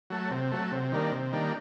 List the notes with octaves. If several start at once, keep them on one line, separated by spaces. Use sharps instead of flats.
F#3 A3
C3
F#3 A3
C3
D#3 G3 A#3 D4
C3
D#3 G3 A#3 D4